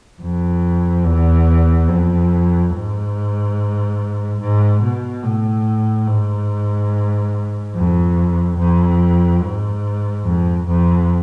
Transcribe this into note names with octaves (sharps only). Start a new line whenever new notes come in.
F2
E2
F2
G#2
G#2
B2
A2
G#2
F2
F2
G#2
F2
F2